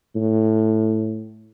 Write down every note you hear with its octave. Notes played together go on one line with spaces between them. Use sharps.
A2